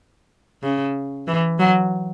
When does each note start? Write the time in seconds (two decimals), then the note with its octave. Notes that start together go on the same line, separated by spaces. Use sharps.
0.63 C#3
1.27 E3
1.59 F#3